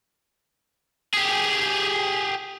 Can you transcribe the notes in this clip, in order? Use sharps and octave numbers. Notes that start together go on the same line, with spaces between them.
G4 G#4